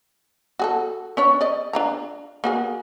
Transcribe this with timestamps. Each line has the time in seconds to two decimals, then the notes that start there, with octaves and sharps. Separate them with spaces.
0.59 F#4 G#4 A4
1.17 C#4 D4 C#5
1.41 D5 D#5
1.73 D4 F4 A#5
2.44 A#3 F#4 G#4